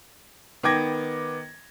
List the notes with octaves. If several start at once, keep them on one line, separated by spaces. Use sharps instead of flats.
D#3 B3 G5 D6 G#6 A#6